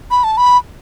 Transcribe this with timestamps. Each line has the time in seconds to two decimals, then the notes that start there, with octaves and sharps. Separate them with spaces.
0.11 B5
0.24 A5
0.37 B5